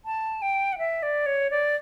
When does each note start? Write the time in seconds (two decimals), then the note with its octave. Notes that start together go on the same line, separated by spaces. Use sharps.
0.05 A5
0.42 G5
0.73 F#5
0.78 E5
1.03 D5
1.26 C#5
1.51 D5